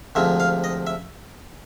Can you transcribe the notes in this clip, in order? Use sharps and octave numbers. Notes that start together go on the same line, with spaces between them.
D2 C3 F3 G#3 E5
F5
D#5
E5